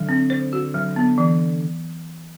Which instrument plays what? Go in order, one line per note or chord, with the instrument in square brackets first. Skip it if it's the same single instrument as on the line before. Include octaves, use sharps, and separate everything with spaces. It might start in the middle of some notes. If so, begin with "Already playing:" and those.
Already playing: [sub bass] D3 [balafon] F#3
[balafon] C4
C5
F#4
F#3
B3
E3